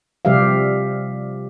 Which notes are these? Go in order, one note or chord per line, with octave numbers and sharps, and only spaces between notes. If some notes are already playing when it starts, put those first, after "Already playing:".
C3 F3 G3 G4 E5 F5